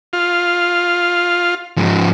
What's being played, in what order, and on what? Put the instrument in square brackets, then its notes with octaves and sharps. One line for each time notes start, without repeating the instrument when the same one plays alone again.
[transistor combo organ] F4
[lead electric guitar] G#2 F3